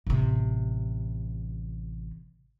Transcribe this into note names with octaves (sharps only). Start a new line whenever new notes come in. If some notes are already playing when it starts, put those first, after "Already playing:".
A1 C3